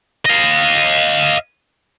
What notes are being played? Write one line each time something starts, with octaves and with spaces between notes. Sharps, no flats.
D#5 F5